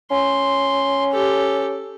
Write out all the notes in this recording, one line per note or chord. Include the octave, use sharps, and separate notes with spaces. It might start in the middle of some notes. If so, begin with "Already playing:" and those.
C#4 C6
G4 A4